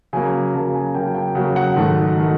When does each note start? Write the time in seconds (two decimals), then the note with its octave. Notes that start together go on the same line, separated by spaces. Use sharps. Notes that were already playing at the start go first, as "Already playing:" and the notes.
0.13 C#3 F#3 A#3 G#5
0.54 C#3 F#3 A#3 A5
0.75 G#5
0.94 C#3 F#3 A#3 G5
1.15 G5
1.35 C#3 F#3 A#3 F#5
1.56 F#5
1.76 G#2 D#3 F#3 A3
2.17 D#3 F#3 A3